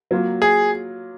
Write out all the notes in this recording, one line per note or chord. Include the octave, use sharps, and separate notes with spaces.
F#3 A#3 F4
G#4